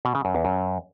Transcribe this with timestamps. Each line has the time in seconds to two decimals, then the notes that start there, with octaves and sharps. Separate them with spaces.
0.05 B2
0.15 C#3
0.25 F#2
0.35 E2
0.45 F#2